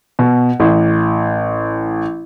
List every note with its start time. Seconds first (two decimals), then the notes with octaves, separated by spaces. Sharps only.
0.19 B2
0.60 A1